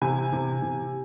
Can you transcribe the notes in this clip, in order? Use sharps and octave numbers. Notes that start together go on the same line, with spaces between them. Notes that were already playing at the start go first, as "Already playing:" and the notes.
C3 G#5
C3
C3